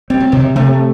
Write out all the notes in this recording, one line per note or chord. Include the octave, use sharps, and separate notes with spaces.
G3 C4
F#3
C3 D#3
C3 A3